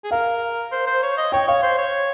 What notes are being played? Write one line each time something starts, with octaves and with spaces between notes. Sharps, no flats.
G#4
A#4 F5
C5
C5
C#5
D#5
C#5 G5
C#5 F5
C5
C#5